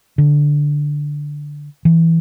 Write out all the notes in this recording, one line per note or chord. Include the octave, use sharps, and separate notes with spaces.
D3
E3